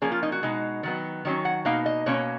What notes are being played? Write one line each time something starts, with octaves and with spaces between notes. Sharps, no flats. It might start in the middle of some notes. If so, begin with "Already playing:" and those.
F3 A#3 C#4 G#4
F4
D#4
F#4
B2 G#3 D#4
D#3 F#3 B3
D#3 F#3 C#4
F#5
B2 A#3 D#4 F5
D#5
B2 A#3 C#4 C#5